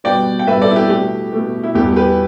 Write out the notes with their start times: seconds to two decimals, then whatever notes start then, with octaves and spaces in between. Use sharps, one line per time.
0.04 B2 G3 B3 D5 G5
0.39 G5
0.47 B2 G3 B3 B4 E5
0.62 A4 D5
0.71 E4
0.76 G4
0.90 B2 A3 G4
1.32 B2 A3
1.64 E4
1.75 E2 B2 G3 B3 G4
1.96 G4 B4